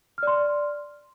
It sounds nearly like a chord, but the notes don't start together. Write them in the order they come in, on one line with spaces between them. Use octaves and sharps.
F6 D5 C6